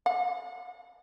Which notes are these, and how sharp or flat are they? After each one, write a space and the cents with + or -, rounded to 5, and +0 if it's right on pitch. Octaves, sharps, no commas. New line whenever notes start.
F#5 -35